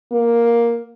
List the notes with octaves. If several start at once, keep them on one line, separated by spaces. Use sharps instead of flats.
A#3